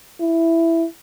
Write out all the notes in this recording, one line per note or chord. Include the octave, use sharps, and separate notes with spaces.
E4